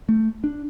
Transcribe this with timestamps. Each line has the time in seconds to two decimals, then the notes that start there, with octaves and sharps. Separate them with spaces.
0.09 A3
0.44 D4